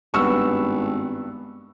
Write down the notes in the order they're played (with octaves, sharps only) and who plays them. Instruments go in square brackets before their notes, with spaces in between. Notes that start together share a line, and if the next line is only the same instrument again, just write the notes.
[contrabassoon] G#1 [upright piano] G2 B3 [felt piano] C#6 E6